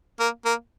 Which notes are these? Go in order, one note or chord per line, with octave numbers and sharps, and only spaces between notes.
A#3
A#3